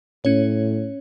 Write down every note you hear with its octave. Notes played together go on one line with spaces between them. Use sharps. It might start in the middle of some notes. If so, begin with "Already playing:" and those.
A2 C#4 C#5